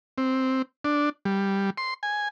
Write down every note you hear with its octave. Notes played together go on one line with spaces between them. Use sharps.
C4
D4
G3
C6
G#5